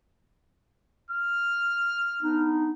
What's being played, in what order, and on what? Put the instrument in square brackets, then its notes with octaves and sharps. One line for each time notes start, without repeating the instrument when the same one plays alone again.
[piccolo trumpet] F6
[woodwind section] B3 D4 D#4